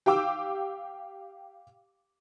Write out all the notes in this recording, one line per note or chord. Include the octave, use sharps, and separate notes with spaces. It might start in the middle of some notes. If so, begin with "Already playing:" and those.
G4 F5 G5 D6 E6